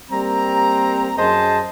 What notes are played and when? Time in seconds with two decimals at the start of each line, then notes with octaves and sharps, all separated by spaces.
0.11 G3 A#3 C4 A#5
1.17 F#2 G#4 C5 D#5 A5 C6